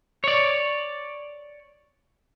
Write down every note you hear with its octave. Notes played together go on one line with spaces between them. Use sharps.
C#5 D5